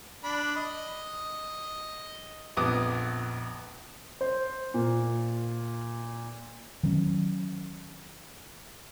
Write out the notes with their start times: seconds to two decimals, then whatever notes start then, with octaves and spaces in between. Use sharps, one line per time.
0.24 D4 B5
0.56 D#5
2.57 A#1 F2 B3 D6 D#6
4.21 C5
4.74 A#2
6.83 D#3 F#3 C#4